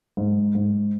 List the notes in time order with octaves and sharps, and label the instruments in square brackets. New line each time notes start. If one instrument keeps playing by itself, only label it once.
[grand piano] G#2
G#2